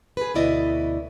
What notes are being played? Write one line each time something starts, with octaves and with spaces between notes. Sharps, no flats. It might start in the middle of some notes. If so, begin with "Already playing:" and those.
G#4 B4
D2 B2 B3 E4 D5 D#5